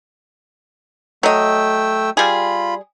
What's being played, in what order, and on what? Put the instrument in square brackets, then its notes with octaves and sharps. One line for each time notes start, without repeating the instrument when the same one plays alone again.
[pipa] F#3 D#5 [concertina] A3 G5 E6
[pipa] G3 G#4 [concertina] F4 B5